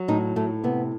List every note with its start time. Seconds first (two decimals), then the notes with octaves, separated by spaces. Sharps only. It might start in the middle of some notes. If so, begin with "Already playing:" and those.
Already playing: F#3
0.08 A2 D#4
0.36 A2 A3
0.64 C3 B3